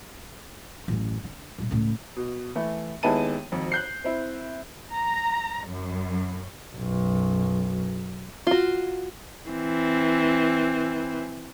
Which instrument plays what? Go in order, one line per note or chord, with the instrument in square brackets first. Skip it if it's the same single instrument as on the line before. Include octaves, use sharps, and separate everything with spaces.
[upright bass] A1 F#2
D3
G2 A#2
C#2 A2
[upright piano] B2
E3 A3 E4
D#2 G#3 B3 E4 A5 D#7
G#1 F2
F#6 G6 C7
C4 E4
[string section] A#5
F#2
[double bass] B1 F#2
[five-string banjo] F4 F#4
[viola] E3 C4